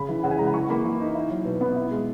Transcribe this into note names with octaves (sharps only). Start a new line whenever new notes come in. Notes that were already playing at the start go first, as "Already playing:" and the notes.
Already playing: C#3 B5
E3
C#3 F#5
G#5
G#3 A#5
B5
E3 C#6
A#3 B5
E3
D#4
E4
F#3
B2
B3 B5
E4
G#3